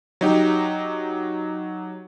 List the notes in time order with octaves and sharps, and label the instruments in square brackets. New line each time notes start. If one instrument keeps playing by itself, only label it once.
[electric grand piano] F#3 D#4 G4